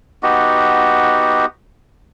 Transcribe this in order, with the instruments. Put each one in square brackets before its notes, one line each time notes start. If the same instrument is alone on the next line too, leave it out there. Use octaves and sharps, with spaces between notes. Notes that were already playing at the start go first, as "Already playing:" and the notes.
[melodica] B3 D#4 F#4 G4